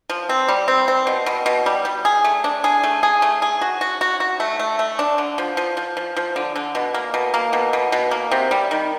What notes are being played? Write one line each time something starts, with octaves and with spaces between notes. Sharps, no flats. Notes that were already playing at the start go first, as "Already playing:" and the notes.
F3
C4
G3
C4
C4
B2
B2
B2
G3
G3
G#4
A3
D4
G#4
A3
G#4
A3
G#4
F#4
F#4
F#4
F#4
A3
A3
A3
D4
D3
F3
F3
F3
F3
F3
D3
D3
B2
A#3
B2
A#3
B2
B2
B2
A#3
C3
G3
D#3